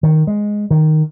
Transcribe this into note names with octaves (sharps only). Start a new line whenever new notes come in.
D#3
G#3
D#3